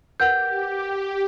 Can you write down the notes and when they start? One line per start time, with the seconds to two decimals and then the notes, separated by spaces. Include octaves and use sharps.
0.20 G4 A#4 B4 F#5 G6